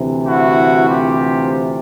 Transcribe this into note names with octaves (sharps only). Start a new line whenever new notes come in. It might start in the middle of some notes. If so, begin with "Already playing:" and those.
Already playing: D2 C3 E3
E4 F#4
F4 G4